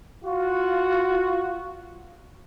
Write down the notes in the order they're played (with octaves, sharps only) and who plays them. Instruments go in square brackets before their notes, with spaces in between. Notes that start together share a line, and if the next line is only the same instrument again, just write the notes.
[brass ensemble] F4 F#4